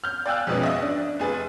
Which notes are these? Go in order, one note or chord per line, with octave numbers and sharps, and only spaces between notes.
F6 G6
D5 F5 G5 G#5 E6 F#6
F2 G#2 B2 B3 C#4
D#5 E5
D4
F1 G#4 B4 A6